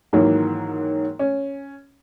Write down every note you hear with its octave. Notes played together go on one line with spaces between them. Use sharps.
G#2 D#3 E3 F#3 A#3
C#4